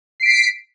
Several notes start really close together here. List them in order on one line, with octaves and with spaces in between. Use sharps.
C7 D7 B6